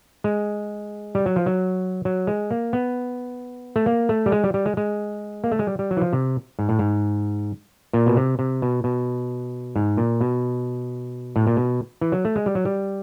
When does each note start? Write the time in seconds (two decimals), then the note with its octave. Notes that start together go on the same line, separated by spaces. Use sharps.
0.24 G#3
1.15 G3
1.26 F#3
1.36 F3
1.46 F#3
2.05 F#3
2.27 G#3
2.51 A#3
2.73 B3
3.76 A3
3.86 A#3
4.09 A3
4.26 G3
4.32 G#3
4.44 G3
4.54 G3
4.66 G#3
4.77 G#3
5.44 A#3
5.52 A3
5.59 G#3
5.67 G3
5.79 G3
5.91 F#3
5.97 E3
6.02 F3
6.13 C3
6.59 G#2
6.69 A2
6.79 G#2
7.93 A#2
8.06 B2
8.17 C3
8.39 C3
8.62 B2
8.84 B2
9.76 G#2
9.97 A#2
10.21 B2
11.36 A2
11.47 A#2
11.57 B2
12.01 E3
12.12 F#3
12.25 A3
12.36 G#3
12.46 G3
12.55 F#3
12.65 G3